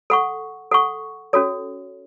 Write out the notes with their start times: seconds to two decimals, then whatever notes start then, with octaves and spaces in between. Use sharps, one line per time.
0.10 A4 F#5 C#6
0.71 A4 F#5 C#6
1.33 C#4 F#4 A4 C#5